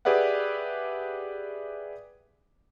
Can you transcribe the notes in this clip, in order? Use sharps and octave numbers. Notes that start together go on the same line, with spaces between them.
G4 G#4 B4 D5 E5 F#5